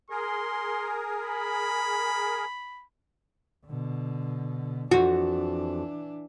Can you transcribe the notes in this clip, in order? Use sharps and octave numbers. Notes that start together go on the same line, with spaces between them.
G#4 A#4 C6
B5
B2 D3
F2 E3 D4 F#4